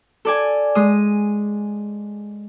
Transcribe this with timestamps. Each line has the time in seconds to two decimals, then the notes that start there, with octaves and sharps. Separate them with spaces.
0.25 A4 D5 G#5
0.75 G#3 D#6